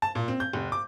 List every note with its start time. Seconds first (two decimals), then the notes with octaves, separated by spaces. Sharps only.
0.02 A5
0.15 A#2
0.28 C4
0.40 G6
0.53 F1
0.72 D6